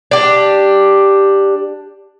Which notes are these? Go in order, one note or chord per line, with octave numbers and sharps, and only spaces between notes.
D4 G4